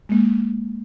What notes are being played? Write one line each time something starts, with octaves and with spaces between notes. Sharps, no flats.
G#3 A#3